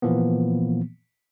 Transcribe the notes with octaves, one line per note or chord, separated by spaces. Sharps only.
A#2 E3 F3 A#3 B3